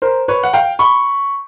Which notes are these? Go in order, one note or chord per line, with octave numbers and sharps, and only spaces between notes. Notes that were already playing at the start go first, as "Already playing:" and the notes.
A#4 C5
B4 C#5
F#5
F5 G5
B5 C#6